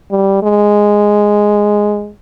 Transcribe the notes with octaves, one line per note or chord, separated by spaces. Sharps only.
G3
G#3